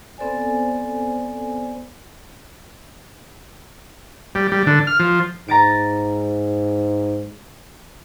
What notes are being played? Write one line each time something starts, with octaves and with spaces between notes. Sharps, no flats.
B3 C4 A4 C5 D5 G#5
G3
G3
D3
F6
F3
G#2 A#5 A6 D7